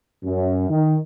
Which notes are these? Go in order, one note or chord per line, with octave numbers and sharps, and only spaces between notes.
F#2
D#3